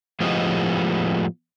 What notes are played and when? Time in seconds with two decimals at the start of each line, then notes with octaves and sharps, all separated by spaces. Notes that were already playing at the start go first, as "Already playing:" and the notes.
0.20 A2 F3 G#3 B3 G4 D#5